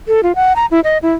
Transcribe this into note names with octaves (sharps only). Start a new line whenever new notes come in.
A4
F4
F#5
A#5
E4
D#5
E4